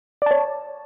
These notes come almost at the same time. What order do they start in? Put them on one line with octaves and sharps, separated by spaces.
D5 A5 C#5